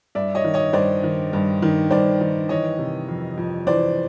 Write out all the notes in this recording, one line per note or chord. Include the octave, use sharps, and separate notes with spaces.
G2 D5 E5
C#5 D#5
D#3
C#5 D#5
G2 C5 D5
D#3
G2
D#3
G2 C5 D5
D#3
E3 C#5 D#5
C3
F2
F2
E3 C5 D5